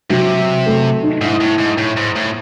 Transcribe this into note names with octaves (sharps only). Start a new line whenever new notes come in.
C3 F#3
A3
D#4
G#2 E4
A2
G#2
A2
G#2
A2